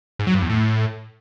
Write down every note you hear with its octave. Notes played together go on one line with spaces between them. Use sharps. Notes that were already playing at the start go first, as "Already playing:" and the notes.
G#2
F#3
G2
E2
A2